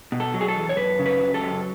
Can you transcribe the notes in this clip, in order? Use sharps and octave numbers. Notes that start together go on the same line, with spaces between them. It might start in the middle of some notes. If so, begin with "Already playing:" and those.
B2
A4
F#3
G#4
A4
E2
C#5
F#2 B4
C#3
B4
F#3
A4
F#2